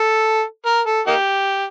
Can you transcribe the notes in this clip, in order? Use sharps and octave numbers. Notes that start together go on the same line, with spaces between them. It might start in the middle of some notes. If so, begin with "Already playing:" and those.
Already playing: A4
A#4
A4
A#3 D#4 G4